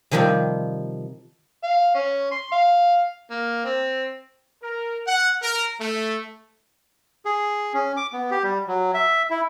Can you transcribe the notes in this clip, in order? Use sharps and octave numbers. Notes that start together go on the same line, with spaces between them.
C3 D#3 F3 G3 C4
F5
C#4
C6
F5
A#3
C4
A#4
F#5
A#4
A3
G#4
C#4
D6
B3
G4
G3
F#3
E5
E4